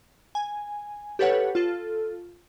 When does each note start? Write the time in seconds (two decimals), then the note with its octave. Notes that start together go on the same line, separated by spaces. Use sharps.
0.35 G#5
1.19 G4 A4 B4 C#5 F#5
1.55 F4 A4